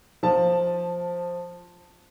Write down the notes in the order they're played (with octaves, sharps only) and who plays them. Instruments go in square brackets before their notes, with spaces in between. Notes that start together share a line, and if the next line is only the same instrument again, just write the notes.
[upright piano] F3 A5